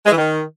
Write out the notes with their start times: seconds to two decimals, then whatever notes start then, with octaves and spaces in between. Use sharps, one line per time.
0.06 G#3
0.11 E3
0.17 D#3